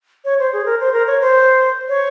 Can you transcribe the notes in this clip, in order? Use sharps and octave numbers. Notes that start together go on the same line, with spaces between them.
C#5
C5
G#4
A#4
C5
A#4
C#5
C5
C#5